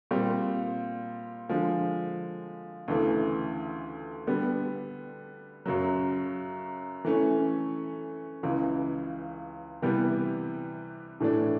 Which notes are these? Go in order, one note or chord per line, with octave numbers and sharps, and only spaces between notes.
A#2 G3 C4
D3 F3 G#3
D2 C#3 E3 A3
D3 G3 B3
F#2 C#3 F#3
E3 A3 C#4
C#2 C#3 E3
C3 E3 G3 B3
A2 E3 A3 D4